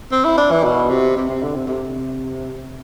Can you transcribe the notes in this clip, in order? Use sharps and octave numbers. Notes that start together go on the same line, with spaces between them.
C4
E4
D4
E3
B2
C3
C3
C3
D3
C3
C3